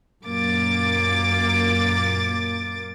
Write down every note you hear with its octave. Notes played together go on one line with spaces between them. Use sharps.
F#2 A#2 A#3 D6 A6